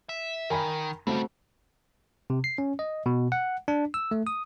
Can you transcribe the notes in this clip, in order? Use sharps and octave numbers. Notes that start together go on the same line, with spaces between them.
E5
D#3 A#4 G#5 B5
C#3 G3 A3 C4 F#4
C3
C7
C#4
D#5
B2
F#5
D4
E6
A3
D#6